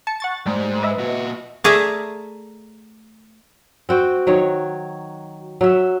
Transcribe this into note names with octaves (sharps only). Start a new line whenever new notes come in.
A5 C#7
F#5 C#6 A6
G#2 G3 A3
B4 D#5 E5
A#2 F#4
A3 G#4 A#4 D5 E5
C4 F#4 G5
D#3 F#3 C#5
F#3 E5